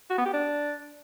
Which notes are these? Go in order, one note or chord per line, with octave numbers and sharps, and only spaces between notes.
F#4
B3
G4
D4